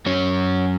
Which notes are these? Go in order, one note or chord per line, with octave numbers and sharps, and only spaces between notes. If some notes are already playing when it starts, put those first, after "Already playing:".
F#2 F#3 C#4 C#5